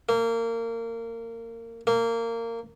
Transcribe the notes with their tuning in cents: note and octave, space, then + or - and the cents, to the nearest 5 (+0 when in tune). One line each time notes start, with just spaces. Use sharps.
A#3 -25
A#3 -20